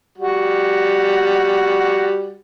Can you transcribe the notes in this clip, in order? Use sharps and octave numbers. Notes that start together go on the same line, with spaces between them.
G3 F#4